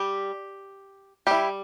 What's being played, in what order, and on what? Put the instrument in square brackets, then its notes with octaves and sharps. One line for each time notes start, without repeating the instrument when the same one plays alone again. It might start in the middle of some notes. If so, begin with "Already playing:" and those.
Already playing: [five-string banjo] G3 G4
G3 E4 G4